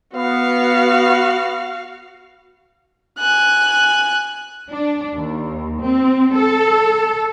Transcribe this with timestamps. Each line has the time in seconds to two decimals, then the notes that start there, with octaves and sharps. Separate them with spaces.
0.15 B3 F#4 F5
3.19 G#5 F#6
4.71 D4
5.15 D#2
5.81 C4
6.34 A4